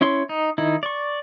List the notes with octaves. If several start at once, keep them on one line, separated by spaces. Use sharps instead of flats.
C#4 E4 C#5 C6
D#4
D#3 D#4 E4
D5 C#6